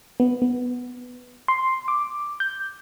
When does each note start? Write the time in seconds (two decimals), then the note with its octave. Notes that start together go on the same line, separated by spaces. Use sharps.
0.20 B3
0.42 B3
1.48 C6
1.88 D6
2.40 G6